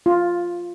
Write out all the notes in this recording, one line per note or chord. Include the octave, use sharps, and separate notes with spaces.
F4